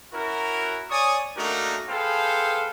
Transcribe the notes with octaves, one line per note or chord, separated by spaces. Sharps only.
C#4 E4 F#4 A#4
C#5 D5 G#5 C#6 D#6
A3 A#3 D4 D#4 F#4 A#4
G#4 A4 B4 C5 F5 G5